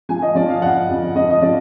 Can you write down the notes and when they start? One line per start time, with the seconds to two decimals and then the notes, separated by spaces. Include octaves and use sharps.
0.09 F3 G#5
0.22 D#5
0.35 F3 D5
0.49 F5
0.62 F2 F#5
0.89 F2
1.15 F3 D#5
1.30 D#5
1.42 F3 D5